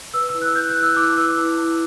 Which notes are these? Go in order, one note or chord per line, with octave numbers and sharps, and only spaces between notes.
B4 E6
E6
E4
F#6
B4 G6
F#6
E4
E6
E4 D6
B4 E6
E4
E4